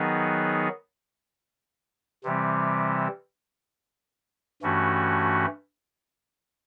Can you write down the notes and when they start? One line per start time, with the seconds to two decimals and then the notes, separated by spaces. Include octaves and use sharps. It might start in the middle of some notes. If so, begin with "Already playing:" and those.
Already playing: D#3 F#3 B3 D#4 G#4
2.24 C3 E3 G3 C4
4.62 G2 E3 A3 C#4 F#4